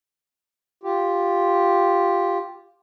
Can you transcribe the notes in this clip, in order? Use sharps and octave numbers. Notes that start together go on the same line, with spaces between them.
F4 G4